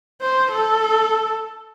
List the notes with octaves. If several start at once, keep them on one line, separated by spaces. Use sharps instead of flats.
C5
A4